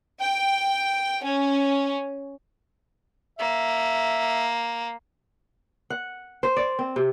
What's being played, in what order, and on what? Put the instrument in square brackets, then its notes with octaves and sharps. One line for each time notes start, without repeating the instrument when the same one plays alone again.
[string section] G5
C#4
[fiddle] A#3 [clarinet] E5
[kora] F#5
C5
D5
C4
C3